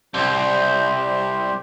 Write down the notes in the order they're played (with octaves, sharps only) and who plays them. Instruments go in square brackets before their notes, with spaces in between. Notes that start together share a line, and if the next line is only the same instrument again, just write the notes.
[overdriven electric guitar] C2 [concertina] G4 C5